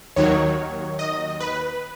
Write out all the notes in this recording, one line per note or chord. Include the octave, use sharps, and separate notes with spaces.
D#2 D#3 F#3 C#5
D#5
B4